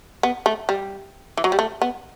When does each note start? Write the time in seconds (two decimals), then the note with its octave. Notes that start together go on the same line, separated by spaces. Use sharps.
0.23 B3
0.46 A3
0.69 G3
1.37 E3
1.44 F#3
1.52 G3
1.59 A3
1.82 B3